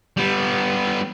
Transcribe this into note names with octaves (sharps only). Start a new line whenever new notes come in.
G3 B3